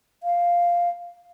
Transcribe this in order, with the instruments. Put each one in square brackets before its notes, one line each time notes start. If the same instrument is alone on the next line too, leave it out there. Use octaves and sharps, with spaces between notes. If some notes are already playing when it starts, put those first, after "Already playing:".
[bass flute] F5